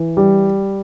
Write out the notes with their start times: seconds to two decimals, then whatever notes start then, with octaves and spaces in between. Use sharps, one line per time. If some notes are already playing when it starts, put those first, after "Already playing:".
Already playing: E3
0.17 G3